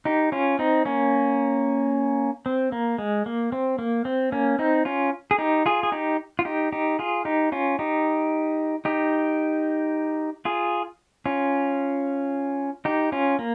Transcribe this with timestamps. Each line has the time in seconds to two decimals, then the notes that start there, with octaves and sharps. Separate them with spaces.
0.05 D#4 G4
0.32 C#4 F4
0.59 C4 D#4
0.85 A#3 C#4
2.46 C4
2.72 A#3
2.98 G#3
3.26 A#3
3.52 C4
3.79 A#3
4.05 C4
4.32 A#3 C#4
4.59 C4 D#4
4.85 C#4 F4
5.31 G#4
5.38 D#4 G4
5.66 F4 G#4
5.83 G#4
5.92 D#4 G4
6.39 F4
6.45 D#4 G4
6.72 D#4 G4
6.99 F4 G#4
7.25 D#4 G4
7.52 C#4 F4
7.79 D#4 G4
8.85 D#4 G4
10.45 F4 G#4
11.26 C#4 F4
12.85 D#4 G4
13.12 C#4 F4
13.39 A#3